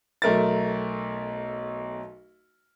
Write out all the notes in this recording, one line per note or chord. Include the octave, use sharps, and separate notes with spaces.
B1 A3 A#4 E5 A6